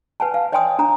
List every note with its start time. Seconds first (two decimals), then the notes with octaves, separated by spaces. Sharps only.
0.20 B4 F#5 G#5 A5
0.34 F5
0.52 C#5 D#5 G5 G#5 C6 D#6
0.79 D4 A#5 D#6